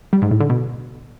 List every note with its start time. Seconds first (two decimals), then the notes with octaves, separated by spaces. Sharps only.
0.13 G3
0.22 G#2
0.31 A2
0.40 D3
0.50 B2